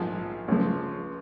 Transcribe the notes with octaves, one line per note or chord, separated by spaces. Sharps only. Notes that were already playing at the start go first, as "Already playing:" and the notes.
Already playing: A#1 G#2 F3
C#2 C#3 F3